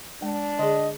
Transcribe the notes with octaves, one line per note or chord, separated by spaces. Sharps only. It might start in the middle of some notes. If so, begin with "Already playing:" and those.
G#3 D4
D3 G#4 D#5